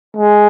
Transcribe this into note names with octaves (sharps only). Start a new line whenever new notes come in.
G#3